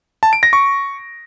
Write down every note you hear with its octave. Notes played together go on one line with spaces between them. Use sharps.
A5
D7
A#6
C#6